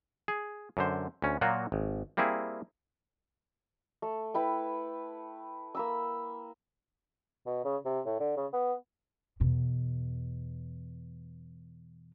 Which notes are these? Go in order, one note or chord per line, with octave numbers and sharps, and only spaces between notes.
G#4
F#2 D3 C5
D2 C#4
A#2 F#3 A#3 F4 F#4
G#1
G3 A#3 C4 E4 G#4
A3
E4 B4 G5
A#3 B5 E6
B2
C#3
C3
A2
D3
C#3
B3
E2 B2